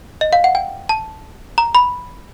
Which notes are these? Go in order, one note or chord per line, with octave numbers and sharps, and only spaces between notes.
D#5
F5
F#5
G5
A5
A#5
B5